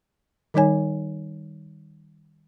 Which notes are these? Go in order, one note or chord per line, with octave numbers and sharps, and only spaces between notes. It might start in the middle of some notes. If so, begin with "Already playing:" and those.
D#3 G3 D#4 C#5 G#5